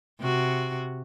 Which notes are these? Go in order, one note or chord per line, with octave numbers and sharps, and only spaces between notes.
C3 F#4